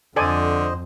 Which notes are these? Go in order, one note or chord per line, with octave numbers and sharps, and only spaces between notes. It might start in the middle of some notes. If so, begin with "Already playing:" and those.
F2 D3 A4 C5 D5 D#5 G#5